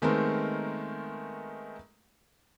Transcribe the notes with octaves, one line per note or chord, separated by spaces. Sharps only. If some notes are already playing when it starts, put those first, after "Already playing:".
D#3 G#3 A3 B3 C4 A#4